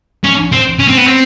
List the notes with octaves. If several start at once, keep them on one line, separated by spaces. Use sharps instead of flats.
C#4
C4
C#4
C4
B3
C4